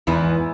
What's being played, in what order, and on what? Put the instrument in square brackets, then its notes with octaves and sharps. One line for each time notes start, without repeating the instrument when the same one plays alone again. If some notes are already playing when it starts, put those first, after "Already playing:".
[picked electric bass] E2 [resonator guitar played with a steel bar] G#2 E3 B3 E4